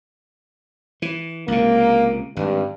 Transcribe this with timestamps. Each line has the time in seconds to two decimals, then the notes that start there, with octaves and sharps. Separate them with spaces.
1.02 E3
1.48 C#2 C3 A#3
2.36 G#1 G2